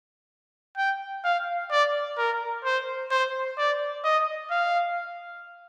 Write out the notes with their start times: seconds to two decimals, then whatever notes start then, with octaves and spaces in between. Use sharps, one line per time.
0.77 G5
1.24 F5
1.71 D5
2.18 A#4
2.64 C5
3.11 C5
3.58 D5
4.04 D#5
4.51 F5